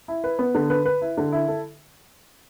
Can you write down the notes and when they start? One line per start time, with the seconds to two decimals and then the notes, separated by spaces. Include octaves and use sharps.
0.08 E4
0.24 B4
0.39 B3
0.55 D3
0.70 B4
0.85 B4
1.02 E4
1.18 D3
1.32 E4
1.48 A4